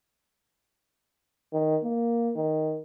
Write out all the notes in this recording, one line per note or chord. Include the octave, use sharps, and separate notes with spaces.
D#3
A#3
D#3